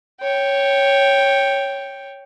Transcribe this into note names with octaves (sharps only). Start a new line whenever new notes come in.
C#5 G5